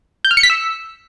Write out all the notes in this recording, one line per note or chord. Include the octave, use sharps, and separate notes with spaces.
G6
F6
C#7
B6
E6